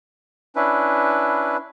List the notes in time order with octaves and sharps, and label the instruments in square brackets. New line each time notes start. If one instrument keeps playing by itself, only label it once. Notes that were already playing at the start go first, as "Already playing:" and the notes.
[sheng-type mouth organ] C#4 D4 E4 B4